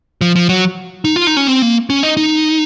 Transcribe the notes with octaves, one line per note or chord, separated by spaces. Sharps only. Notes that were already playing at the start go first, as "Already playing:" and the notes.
F3
F3
F#3
D#4
F4
D#4
C#4
C4
A#3
C#4
D#4
D#4